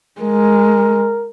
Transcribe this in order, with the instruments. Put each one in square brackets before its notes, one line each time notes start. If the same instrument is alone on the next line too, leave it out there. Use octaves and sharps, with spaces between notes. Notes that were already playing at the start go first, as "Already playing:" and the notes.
[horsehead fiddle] G#3 [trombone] A#4